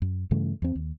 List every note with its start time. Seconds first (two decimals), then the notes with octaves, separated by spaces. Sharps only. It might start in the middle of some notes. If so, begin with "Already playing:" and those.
0.02 F#2
0.31 G2 C#3 E3 A3
0.62 E2 C4
0.76 D#2